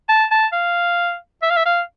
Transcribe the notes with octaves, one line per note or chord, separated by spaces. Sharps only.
A5
A5
F5
E5
F5
E5
F5